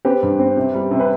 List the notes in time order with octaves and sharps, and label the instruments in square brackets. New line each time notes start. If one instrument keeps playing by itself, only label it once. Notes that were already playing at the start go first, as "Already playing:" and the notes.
[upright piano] C4 G4 B4
G2
C4
C3
G3
C3
B4